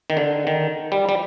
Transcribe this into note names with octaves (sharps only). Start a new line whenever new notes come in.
D#3
D3
D#3
G3
G3